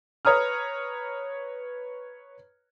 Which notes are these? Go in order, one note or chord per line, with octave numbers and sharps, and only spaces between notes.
B4 C#5 A#5 D#6 F6